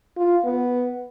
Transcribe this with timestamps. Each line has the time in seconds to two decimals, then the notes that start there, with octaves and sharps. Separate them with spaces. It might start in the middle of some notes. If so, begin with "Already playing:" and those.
0.18 F4
0.45 B3